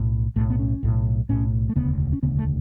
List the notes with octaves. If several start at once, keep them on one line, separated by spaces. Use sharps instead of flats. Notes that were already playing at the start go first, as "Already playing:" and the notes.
Already playing: B1 A2
B1 A2 A3
B3
C#4
B1 A2
B1 A2 C#4
A3
E1 D2 C#3 B3
C#4
E1 D2 C#3 B3
A3